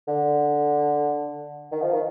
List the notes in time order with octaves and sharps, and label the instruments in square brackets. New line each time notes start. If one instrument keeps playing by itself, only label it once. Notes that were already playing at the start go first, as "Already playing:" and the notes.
[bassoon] D3
D#3
F3
D#3